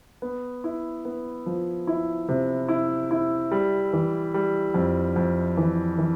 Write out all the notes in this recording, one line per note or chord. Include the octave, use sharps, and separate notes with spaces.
B3
E4
B3
F3
E4
C3
E4
E4
G3
E3
G3
F2
F2
E3
E3